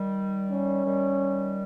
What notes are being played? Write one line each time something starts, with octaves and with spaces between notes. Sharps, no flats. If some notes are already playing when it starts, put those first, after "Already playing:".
Already playing: D#3 G3
C#4
D#3 G3